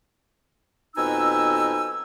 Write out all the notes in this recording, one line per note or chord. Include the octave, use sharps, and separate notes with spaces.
F2 B2 D#4 G#5 E6